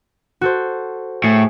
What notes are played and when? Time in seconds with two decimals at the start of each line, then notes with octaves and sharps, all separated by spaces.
0.41 F#4 A4 C5
1.24 A2 G#4